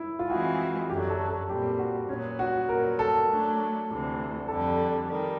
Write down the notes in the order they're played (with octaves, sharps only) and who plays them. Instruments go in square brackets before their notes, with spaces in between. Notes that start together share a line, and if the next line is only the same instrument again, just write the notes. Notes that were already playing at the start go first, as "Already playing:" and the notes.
Already playing: [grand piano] E4
F4
[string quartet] E3 G#3 C4 E4 G#4 [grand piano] F#4
[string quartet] F#2 D3 F#3 [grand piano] G4
[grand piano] A4
A4
[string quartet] A#2 G3 C4 [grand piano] G4
[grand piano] F#4
[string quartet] A#2 F#3 B3 [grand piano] C#4
[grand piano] F#4
[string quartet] A#2 F#3 B3 [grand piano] A#4
[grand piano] A4
[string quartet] F#3 A3 D4
D2 C3 E3
[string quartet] F2 D3 G3 [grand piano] A4
[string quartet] D#3 G3